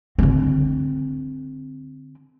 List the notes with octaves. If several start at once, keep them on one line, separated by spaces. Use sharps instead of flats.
D3 C4